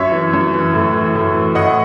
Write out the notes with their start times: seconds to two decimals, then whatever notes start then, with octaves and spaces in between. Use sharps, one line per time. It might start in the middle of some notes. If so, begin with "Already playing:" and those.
Already playing: F#2 C#5 E5
0.12 E3
0.33 F#2
0.54 E3
0.73 A2
0.94 E3
1.15 A2
1.35 E3
1.55 A2 D#5 F#5